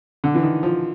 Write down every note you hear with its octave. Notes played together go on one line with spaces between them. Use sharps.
D3
E3
D#3
F3